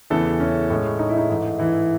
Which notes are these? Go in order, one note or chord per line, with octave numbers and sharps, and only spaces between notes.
E2 C#3 E3 A3 A4
C#4
A2 G#3
D#4
E4
D#4
G#2 E3 A3
E3 E4